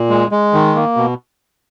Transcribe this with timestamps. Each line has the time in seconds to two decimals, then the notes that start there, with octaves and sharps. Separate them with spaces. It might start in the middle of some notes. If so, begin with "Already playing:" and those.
Already playing: A#2
0.10 G#3
0.32 G#3
0.54 D#3
0.75 A#3
0.97 B2